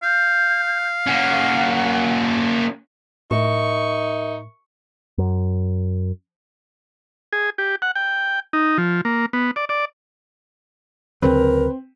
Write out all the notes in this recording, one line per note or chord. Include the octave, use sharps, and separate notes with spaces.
F5 G6
A#3 C#4 F#5
A2 D#4 A#4 E5 C#6
F#2
G#4
G4
F#5
G5
D#4
F3
A#3
B3
D5
D5
D2 C#3 F#3 C4 A#4 B4